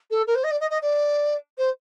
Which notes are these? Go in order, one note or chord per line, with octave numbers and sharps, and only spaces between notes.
A4
A#4
C5
D#5
D5
D#5
D#5
D5
C5